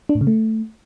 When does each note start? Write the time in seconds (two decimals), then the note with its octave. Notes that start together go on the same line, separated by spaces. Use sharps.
0.09 D4
0.15 A2
0.21 C#3
0.27 A3